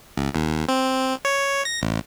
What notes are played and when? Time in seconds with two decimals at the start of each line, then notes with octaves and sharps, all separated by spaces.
0.17 C#2
0.35 D#2
0.69 C4
1.25 C#5
1.65 A#6
1.82 A1